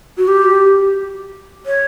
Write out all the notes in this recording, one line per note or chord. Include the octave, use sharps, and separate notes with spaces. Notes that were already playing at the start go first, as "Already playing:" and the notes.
F#4
G4
C#5